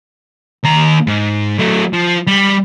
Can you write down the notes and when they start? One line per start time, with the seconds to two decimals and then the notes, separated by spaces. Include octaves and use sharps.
0.64 D#2 A#5
1.08 G#2
1.59 F#3 A3
1.93 F3
2.27 G3